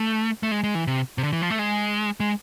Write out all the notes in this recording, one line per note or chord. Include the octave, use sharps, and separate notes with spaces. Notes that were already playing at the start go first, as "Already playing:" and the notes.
Already playing: A3
A3
G#3
G#3
E3
C3
C3
D3
E3
F3
A3
G#3
G#3